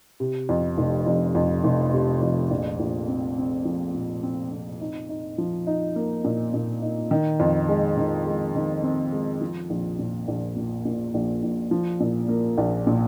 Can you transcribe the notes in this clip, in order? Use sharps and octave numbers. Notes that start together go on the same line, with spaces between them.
C3
F2
F1
F2
F2
F1
C3
F2
A#1
A#1
C4
C4
F3
A#2
C4
C4
D#4
D#4
F3
D#4
A#3
A#2
A#2
D#4
D#3
F2
G#3
D#3
G#3
D#3
C4
G#3
F3
A#1
A#2
A#1
A#2
A#2
A#1
A#1
F3
A#2
A#3
A#1
A#2